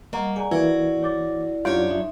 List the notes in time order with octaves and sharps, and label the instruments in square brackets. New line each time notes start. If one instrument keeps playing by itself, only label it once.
[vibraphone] G3 F#5 C#6 [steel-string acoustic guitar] A#3 [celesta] D#5 A#5
[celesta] G#4 A#5 [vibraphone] D5 F#5 G#5
[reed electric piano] E3 A#3 [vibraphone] E4 D5 [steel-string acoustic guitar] F#4 [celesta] G#6
[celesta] C#5 D6 A6
[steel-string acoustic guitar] F#2 D4 C#5 [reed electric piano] F#3 F4 [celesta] G4 G6 D7
[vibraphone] D#4 E5 C6